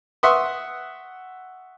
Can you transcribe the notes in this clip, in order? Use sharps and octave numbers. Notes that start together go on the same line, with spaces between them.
E5 F#5 C6 C#6 D#6